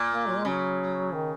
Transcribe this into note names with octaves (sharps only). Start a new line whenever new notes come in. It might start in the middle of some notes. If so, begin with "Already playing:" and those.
Already playing: A#2
A#3
F#3
G#3
C#3 F#3
D#3